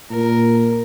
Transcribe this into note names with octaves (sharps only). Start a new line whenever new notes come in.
A#2 A#4